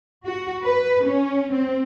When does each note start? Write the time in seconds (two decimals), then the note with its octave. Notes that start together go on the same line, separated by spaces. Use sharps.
0.25 F#4
0.62 B4
1.03 C#4
1.52 C4